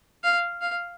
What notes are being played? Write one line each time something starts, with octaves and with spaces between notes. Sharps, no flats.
F5
F5